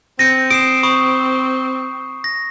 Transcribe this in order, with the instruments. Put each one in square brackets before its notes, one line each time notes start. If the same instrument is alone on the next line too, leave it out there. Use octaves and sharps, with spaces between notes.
[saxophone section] C4 [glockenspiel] G6 C#7 D#7 [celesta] A#6
[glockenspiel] D#6 C7 E7 [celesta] D7
[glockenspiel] B5 C#6 D#6
A#6